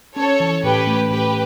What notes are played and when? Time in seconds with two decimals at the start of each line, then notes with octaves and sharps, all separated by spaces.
0.16 C#4 A4 C#5
0.40 E3
0.63 A2 G4 B4
0.87 A3
1.10 A2 G4 B4